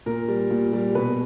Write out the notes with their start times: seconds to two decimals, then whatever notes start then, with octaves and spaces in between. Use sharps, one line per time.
0.06 A#2 A#4
0.28 G3
0.51 A#2
0.73 G3
0.95 B2 B4